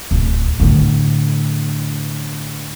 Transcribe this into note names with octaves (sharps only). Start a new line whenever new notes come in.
D1
A2 D3